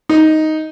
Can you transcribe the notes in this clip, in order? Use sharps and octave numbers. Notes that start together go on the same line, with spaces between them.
D#4